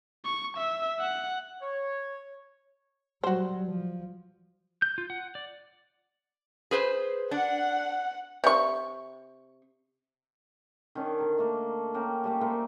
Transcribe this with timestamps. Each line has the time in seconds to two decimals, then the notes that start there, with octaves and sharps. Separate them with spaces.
0.25 C#6
0.57 E5
1.00 F#5
1.61 C#5
3.24 F#3 G3 F#4 C5
3.66 F3
4.82 G6
4.98 F4
5.10 F#5
5.35 D5
6.71 G#4 B4 C5
7.31 D4 F#5
8.44 C3 C#6
10.95 D#3 C#4 D4
11.19 D3 A#4
11.38 A3 A#3
11.94 A#3 C#4 G5
12.24 G3 A3 A#3
12.41 A3 A#3 A4 C5